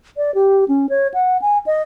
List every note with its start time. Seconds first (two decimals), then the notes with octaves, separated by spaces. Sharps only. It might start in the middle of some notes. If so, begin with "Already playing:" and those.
0.17 D5
0.35 G4
0.68 C#4
0.89 C#5
1.14 F#5
1.42 G#5
1.66 D#5